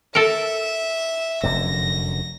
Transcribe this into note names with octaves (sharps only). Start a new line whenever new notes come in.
A4 A#4 E5
F1 F#2 D3 A#6